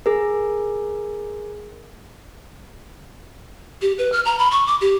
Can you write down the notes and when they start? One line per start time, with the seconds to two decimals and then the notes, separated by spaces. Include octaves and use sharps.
0.06 G#4 A#4
3.82 G4
3.98 B4
4.12 F6
4.25 A#5
4.39 B5
4.51 C#6
4.67 D6
4.81 G4